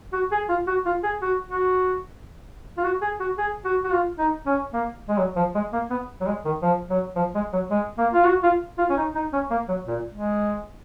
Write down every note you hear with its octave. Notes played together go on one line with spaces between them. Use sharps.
F#4
G#4
F4
F#4
F4
G#4
F#4
F#4
F4
F#4
G#4
F#4
G#4
F#4
F#4
F4
D#4
C#4
A#3
G#3
F#3
F3
G#3
A#3
B3
F#3
G#3
D#3
F3
F#3
F3
G#3
F#3
G#3
A#3
F4
F#4
F4
F4
C#4
D#4
D#4
C#4
A#3
F#3
A#2
G#3